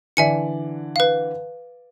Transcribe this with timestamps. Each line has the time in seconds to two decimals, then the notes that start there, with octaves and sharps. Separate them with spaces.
0.17 D3 E3 D5 E5 G#5 C#7
0.96 B4 F5